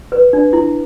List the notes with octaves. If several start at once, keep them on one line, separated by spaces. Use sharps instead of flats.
B4
D4
E4